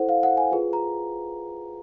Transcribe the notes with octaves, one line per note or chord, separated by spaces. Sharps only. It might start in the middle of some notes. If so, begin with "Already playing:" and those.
Already playing: E4 A4 C5 F#5
F5
F#5
G#5
F4 G#4 B4
A#5